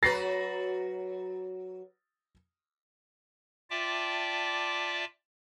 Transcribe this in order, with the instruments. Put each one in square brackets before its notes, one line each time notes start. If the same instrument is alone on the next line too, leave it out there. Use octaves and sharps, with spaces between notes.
[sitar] F#3 F#4 B4 [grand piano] A6 A#6 C7
[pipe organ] F4 D5 E5 G5 A5 D6